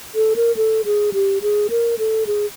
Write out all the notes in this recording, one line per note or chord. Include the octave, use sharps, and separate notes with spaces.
A4
A#4
A4
G#4
G4
G#4
A#4
A4
G#4